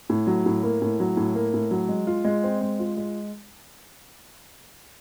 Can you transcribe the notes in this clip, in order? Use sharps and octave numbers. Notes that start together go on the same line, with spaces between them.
A2
F#3
A2
A#3
A2
F#3
A2
A#3
A2
F#3
G#3
F4
G#3
C4
G#3
F4
G#3